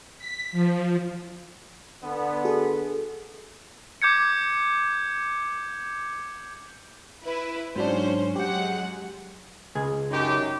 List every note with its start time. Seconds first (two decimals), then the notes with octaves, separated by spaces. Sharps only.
0.19 B6
0.52 F3
2.03 D3 B3
2.45 F#4 G#4 A4
4.02 D6 G6 G#6 C#7
7.24 E4 B4
7.76 G#2 F#3 C#4 D4 C5
8.36 F#3 G#3 G4 F#5 G5
9.75 C#2 G#4
10.11 F#2 D#4 G4